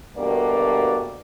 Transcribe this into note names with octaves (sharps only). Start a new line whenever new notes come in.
D2 G2 B2 A#3 G4 D5